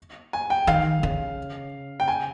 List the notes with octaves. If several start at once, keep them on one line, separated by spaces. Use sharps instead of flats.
G#5
G5
D#3 F5
C#3
G5
G#5